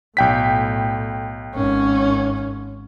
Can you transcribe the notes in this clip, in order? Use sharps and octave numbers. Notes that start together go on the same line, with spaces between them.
B1 A2 G5 B6
G#1 C#4